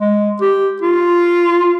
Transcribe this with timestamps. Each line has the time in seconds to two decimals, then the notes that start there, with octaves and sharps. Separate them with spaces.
0.01 G#3
0.41 G4
0.82 F4